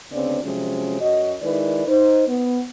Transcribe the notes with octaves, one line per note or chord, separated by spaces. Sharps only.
D2 C#3 B3 C4 D4 D5
C3 F3 F#3 G#3 C#4
F#2 F#4 D#5
D#3 G#3 E4 B4 D5
D#4 C5
B3